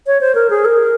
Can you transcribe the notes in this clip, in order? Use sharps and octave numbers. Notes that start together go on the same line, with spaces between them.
C#5
C5
A#4
G#4
A#4